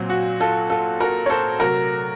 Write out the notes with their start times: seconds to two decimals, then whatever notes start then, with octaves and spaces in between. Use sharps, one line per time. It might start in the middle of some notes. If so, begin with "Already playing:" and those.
Already playing: A#2 F#3 C4
0.10 F#4
0.40 F4 A4
0.70 F4 A4
1.00 F#4 A#4
1.26 C#5
1.30 A4 C5
1.60 C3 F#3 A3 F#4 A#4